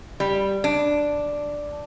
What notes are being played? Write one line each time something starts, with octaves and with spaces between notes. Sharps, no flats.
G3
D4